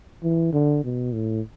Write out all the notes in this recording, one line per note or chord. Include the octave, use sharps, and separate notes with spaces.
E3
D3
B2
A2